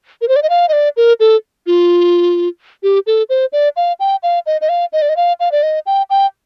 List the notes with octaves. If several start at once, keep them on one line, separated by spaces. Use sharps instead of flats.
A#4
C5
D5
D#5
F5
D#5
D5
A#4
A4
F4
G4
A4
C5
D5
F5
G5
F5
D#5
D#5
F5
D#5
D5
D#5
F5
F5
D5
D#5
G5
G5